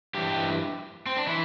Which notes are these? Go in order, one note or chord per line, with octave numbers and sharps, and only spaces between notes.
G2 E3 G4
C4
D4
E3 E4